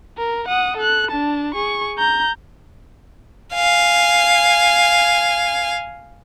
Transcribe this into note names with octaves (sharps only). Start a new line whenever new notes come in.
A#4
F#5 D#6
A4 F#6
D4 A5
G#4 C#6
A#5 G6
F5 G#5